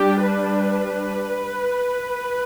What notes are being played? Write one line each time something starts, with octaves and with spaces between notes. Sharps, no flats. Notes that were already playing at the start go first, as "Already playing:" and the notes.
Already playing: G3 D4 G4
B4